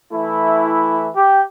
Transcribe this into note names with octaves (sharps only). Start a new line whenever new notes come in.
E3 A3 E4
G4